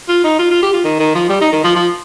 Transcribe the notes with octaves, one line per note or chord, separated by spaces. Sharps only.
F4
D#4
F4
F4
G4
F4
D#3
D#3
F3
G3
D#4
D#3
F3
F3